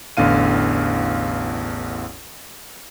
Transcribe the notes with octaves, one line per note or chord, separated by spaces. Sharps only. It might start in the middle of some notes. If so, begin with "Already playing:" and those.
A1 E2 D3 F5 D#7